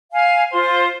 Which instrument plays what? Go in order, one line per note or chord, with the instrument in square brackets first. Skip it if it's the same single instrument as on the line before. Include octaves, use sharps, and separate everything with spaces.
[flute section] F5 G#5
F4 C5